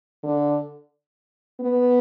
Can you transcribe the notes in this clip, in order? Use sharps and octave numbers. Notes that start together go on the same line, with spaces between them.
D3
B3